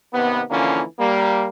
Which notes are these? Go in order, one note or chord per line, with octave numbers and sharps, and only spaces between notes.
D#2 C3 B3
D3 E3 F3 A#3 C#4
G3 A#3